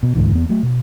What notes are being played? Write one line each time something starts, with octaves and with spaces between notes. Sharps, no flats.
B2
D2 G#2 D3 E3
E2 B3
F#3 A3
B2